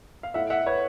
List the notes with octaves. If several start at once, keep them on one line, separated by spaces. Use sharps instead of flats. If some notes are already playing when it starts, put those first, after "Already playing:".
F5
A2 E5 F#5
E5 F#5
B4 C#5